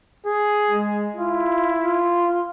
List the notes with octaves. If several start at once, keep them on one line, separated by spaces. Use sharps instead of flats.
G#4
G#3
E4 F4
F4